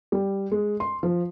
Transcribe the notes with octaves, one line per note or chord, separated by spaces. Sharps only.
G3
G#3
C6
F3